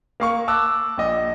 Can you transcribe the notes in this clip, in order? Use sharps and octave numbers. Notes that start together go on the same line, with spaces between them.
A#3 F5 C#6
A5 D6 E6 F#6
A#1 D#5